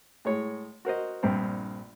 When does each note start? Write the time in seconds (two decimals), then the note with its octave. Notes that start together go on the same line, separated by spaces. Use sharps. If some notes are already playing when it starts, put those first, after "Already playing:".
0.25 A2 G#3 C#5
0.85 F#4 A#4 C5 D#5
1.23 A#1 G2 C4